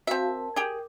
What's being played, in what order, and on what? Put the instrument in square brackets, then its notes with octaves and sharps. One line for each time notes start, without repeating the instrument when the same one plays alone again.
[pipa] C4 E5 [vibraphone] F#4 F5 A5
[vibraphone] A#4 A5
[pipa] G4 G#4 [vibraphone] A#4